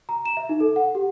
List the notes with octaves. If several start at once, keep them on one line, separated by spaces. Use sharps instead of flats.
A#5
E7
E5
D#4
A4
F#5
G4